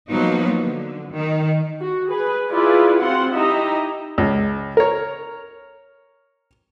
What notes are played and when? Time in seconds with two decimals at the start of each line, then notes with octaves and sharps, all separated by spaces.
0.11 F3 F#3 A#3 B3 D#4
0.61 D3
1.12 D#3
1.81 F#4
2.10 G#4 B4
2.50 E4 F4 G#4 B4 D5
3.01 C4 F4 F#4 F#5 C6
3.34 D#4 E4 G4 D#5 E5 A#5
4.18 C#2
4.77 A#4 C#5